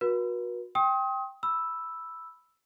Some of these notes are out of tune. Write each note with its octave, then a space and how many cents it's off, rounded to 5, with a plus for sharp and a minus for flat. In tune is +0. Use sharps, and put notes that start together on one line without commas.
F#4 -25 B4 -45
G5 +0 C6 +40 D#6 +30
B5 +0 E6 +0